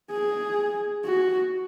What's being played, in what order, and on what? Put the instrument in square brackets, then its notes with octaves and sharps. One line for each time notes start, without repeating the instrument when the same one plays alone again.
[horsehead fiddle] G#4
F#4